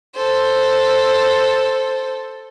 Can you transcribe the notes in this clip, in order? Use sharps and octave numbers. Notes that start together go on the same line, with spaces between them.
A4 C5